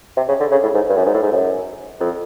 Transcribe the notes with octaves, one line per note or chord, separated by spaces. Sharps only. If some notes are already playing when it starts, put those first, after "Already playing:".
C3
C#3
D3
C#3
A2
G#2
G2
F#2
G#2
A2
G#2
F#2
F2